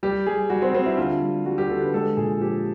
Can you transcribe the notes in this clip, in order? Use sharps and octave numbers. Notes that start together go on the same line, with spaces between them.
G3 G4
G3 G#4
G3 F#4
C4
G3 C4
E4
D3 F4
G3
G3 F#4
G4
D3 A4
B4
G#3 A4
A#2 G#4
F3 G4